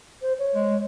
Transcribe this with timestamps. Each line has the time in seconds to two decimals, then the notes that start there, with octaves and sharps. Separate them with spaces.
0.22 C5
0.39 C#5
0.55 G#3